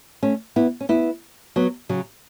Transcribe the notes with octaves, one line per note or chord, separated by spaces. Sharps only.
A3 C#4
B3 E4
C#4
B3 E4
F#3 B3
C#3 F#3